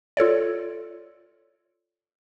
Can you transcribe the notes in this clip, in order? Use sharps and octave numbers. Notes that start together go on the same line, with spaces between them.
F4 A4 C#5 D5